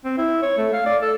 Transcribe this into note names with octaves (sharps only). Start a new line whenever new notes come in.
C4
E4
C#5
A3
F5
D5
A4